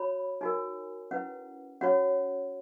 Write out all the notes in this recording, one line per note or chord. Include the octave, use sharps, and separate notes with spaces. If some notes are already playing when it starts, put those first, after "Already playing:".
Already playing: F#4 C#5 B5
D#4 F#4 A#4 G#5
C#4 E4 B4 F#5
C#4 F#4 C#5 F#5